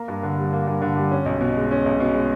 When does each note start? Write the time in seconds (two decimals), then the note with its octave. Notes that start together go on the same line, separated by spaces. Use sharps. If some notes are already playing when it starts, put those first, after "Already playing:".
Already playing: A#3 A#5
0.08 G2
0.23 D3
0.38 G3
0.53 A#3
0.67 G2
0.82 D3
0.96 G3
1.11 C#4
1.26 B1
1.41 B2
1.56 G#3
1.71 C#4
1.85 B1
2.00 B2
2.15 G#3